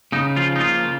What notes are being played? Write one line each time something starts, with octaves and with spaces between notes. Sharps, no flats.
C#3 D#4
F3 F4
D#4
A#3 F4
C#3